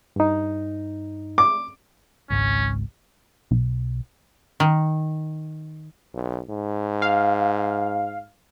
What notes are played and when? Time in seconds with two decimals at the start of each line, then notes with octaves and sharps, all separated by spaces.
0.16 G2 D#4
1.38 D6
2.30 G#1 C#2 G#2 C#4
3.51 B1
4.60 D#3
6.14 B1
6.49 G#2
7.02 F5